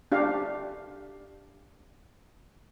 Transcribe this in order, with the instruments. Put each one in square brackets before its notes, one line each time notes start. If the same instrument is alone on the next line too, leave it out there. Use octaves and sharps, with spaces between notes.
[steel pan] D4 G4 F5